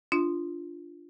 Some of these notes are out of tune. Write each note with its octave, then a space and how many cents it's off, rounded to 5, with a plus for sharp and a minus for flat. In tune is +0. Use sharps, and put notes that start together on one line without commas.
D4 +0 F4 -10